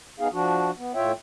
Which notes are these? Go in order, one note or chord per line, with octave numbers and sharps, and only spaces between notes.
B3 D#4 G#4 F5
F3 D4 F#4
B3
A2 F4 C#5 E5 G5